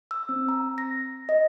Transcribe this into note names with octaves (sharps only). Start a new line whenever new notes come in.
E6
C4
A#5
A#6
D#5